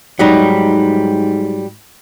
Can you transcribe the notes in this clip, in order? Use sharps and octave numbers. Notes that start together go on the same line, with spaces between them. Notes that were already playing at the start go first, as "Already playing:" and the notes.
G#2 F#3 G3 D#4